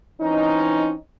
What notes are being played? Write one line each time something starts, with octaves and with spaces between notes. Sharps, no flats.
E3 C4 C#4 D#4